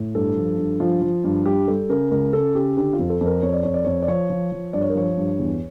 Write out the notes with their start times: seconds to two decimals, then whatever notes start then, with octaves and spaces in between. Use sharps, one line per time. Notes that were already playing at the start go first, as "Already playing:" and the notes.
Already playing: A2
0.15 G2 A4
0.37 F3
0.58 G2
0.80 F3 F4
1.02 F3
1.24 G2
1.46 G3 G4
1.67 G3 A4
1.89 C#3 A#4
2.11 C#2 A#4
2.33 C#3 A4
2.55 C#3 G4
2.77 D3 G4
2.93 F4
2.99 F2
3.09 A4
3.21 F2
3.26 A#4
3.42 F2 C#5
3.53 D5
3.63 F2 C#5
3.74 D5
3.84 F2 C#5
4.02 D5
4.08 F3 C#5
4.30 F3
4.52 F3
4.73 G2 D5
4.81 C#5
4.90 A#4
4.95 F3 C#5
5.17 G2
5.39 E2